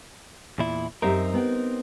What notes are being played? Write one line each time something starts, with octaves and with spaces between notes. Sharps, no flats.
E2 A#2 E4
F#2 C4 D#4 G4 A#4 E5
B3 G5